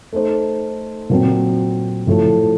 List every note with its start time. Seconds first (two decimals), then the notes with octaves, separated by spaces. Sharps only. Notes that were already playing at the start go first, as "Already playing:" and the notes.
0.13 A3 D#4 A4 C5
1.10 A#2 F#3 C4
2.07 A2 F3 A3